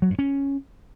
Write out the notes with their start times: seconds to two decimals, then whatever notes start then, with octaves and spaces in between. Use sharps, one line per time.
0.02 F#3
0.10 G2
0.19 C#4